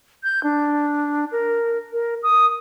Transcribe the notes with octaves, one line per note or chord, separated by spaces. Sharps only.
G6
D4
A#4
A#4
D#6